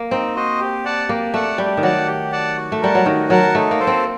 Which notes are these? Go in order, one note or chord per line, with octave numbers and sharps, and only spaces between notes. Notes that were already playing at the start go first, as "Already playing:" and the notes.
Already playing: A#3
C4 D#4
F#4 C5 D#5
G4
D5 F#5 A5
A#3 G4
A3 D5 F#5 A5
G3 G4
D#3
F#3 D5 F#5 A5
G4
D5 F#5 A5
F#4
A3
G3 A#4 F#5 A5
F#3
D#3 F#4
F#3 A#4 F#5 A5
A3 D#4
A#3
A4 C5
C4